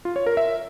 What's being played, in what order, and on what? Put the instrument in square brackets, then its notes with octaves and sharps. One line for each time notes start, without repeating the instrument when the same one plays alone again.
[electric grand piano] F4
C#5
A#4
E5